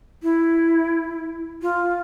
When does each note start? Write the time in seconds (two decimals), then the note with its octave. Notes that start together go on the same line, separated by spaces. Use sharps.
0.23 E4
1.62 F4